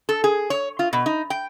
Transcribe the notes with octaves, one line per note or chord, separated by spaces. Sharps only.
A4
G#4
C#5
F4
B2
D#4
G5